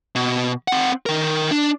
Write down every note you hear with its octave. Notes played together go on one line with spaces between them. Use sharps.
B2
C4 F#5
D#3 A#4
D4